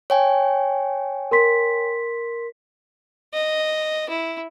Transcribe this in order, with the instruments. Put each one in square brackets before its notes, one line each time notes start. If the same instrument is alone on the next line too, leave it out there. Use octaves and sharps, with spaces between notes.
[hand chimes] C#5 G5 G#5
[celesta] A#4 C6 B6
[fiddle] D#5
E4